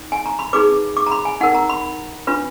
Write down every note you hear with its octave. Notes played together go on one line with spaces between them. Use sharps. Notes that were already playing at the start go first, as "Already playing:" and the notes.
Already playing: D#4
G#5
A#5
B5
D#4 G#4 B4 D6
D6
A#5
B5
G#5
D#4 A#4 F#5
A#5
B5
D4 F4 B4